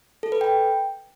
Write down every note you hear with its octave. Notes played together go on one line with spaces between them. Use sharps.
A4
B4
G5